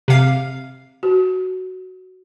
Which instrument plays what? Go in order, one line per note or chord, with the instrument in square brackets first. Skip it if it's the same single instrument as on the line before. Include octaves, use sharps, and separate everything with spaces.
[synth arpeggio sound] C3 F5
[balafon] F#4